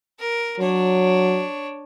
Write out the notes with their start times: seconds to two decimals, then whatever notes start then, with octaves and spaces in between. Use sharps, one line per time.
0.20 A#4
0.60 F#3 D4 C#5